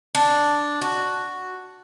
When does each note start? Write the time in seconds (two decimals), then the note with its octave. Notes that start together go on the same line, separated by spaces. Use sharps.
0.15 D4
0.82 F#4